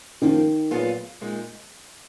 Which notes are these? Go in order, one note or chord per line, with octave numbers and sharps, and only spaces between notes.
D#3 F3 A#3 D#4
A#2 F#3 B3 F4 G#4
A#2 G#3 D#4